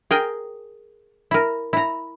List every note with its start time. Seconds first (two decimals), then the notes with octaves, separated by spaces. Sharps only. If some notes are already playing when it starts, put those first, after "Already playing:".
0.11 G#4 A#4 G5
1.31 E4 A#4
1.73 E4 A#5